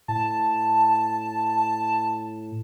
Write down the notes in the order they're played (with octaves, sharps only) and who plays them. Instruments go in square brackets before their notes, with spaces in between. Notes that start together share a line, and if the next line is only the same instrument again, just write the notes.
[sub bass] A2 [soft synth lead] A5